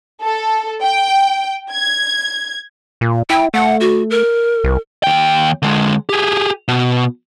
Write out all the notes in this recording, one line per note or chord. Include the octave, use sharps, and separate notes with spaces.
A4
G5
G#6
A#2
E4 G5
A3 F#5
F#4
A#4
C2
D#2 G5
D3 G#3
G4 G#4
B2